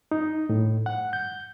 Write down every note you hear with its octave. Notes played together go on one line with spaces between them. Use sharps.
D#4
A2
F#5
G6